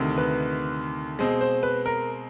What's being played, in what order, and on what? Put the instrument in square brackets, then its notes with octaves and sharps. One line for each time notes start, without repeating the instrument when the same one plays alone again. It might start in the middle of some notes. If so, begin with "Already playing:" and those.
Already playing: [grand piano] D2 C3 D#3
B4
B2 G#3 C4
C5
B4
A#4